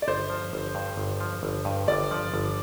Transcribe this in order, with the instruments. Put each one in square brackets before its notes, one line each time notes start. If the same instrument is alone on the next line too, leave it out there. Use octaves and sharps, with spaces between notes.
[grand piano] D5
[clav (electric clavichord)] G1 [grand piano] C5
[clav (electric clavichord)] F3
G1
G2
G1
F3
G1
G2
[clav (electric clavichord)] G1 [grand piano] D5
[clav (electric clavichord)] F3
G1